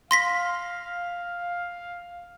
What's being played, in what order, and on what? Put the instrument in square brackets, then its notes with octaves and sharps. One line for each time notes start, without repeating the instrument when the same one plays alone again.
[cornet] F5 [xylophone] C6 A#6 B6